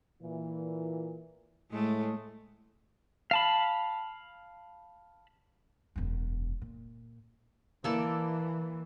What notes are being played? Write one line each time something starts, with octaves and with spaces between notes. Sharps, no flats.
A#2 E3
A2 G#3 A3
F5 A5 B5
E1 F#2
A#2
E3 A#3 A4 D5